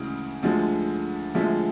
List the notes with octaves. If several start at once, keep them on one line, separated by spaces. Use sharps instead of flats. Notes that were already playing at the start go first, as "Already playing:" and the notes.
Already playing: D2 C#3 E3 G#3
D2 D3 F3 G#3
D2 D3 F3 G#3 E5